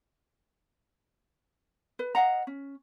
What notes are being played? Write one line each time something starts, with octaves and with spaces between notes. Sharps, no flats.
B4
D#5 F5 F#5 A#5
C#4